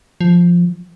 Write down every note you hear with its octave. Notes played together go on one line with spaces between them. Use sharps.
F3